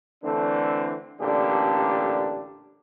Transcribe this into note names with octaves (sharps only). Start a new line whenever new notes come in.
D3 E3 A3 C4 D4
A1 A#2 D3 D4 G4